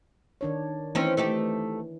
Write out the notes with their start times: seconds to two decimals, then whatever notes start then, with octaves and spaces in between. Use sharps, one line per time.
0.41 D#3 D4 C#5
0.95 E3 C4 C#4 D#4
1.17 A3 D#4 G4